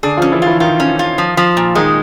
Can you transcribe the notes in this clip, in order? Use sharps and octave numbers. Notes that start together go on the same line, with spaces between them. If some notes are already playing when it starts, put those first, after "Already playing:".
D3 D4 G#4
F3 C#4 F4
E3 E4
E3 E4 F4
D#3 D#4 F4
C#4
F4
F3
F3
A#2
D#3 G#3 D#4